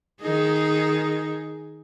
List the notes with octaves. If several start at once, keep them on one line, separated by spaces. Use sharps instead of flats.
D#3 D#4 G#4